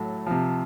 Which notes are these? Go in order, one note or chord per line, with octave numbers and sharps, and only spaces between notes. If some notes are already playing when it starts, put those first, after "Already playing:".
Already playing: A2 F#3 A4
C3 F3